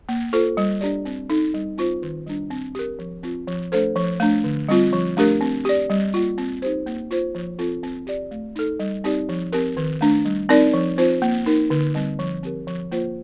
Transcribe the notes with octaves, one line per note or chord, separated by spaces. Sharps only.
A#3
F4 A4 C5
G3
D4 G4 D5
C4
D#4 A4
G3
C4 F4 C5
D#3
G3 D4
C4
G4 A#4
F3
C4 F4
F3
A3 D4 A4 C5
F3
A3 D4
D3
G3 C4 F4
F3
A3 D4 G4 A#4
C4
G4 D5
G3
A#3 F4
C4
D#4 G4 C5
A#3
F4 C5
F3
C4 F4 A4
C4
G4 D5
A3
D#4 A4
G3
C4 D#4 G4 D5
F3
C4 G4 A#4
D#3
A3 D4
G3
C4 D#4 A#4 D5
F3
C4 F4 C5
A#3
D#4 A#4
D3
G3 C4
F3
C4 G4 A#4
F3
A#3 F4 C5